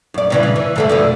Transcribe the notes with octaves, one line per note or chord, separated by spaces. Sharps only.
F#2 D5
G2 C#3 E3
C#3
E3
G#2 D3 A3
F2 B2 D3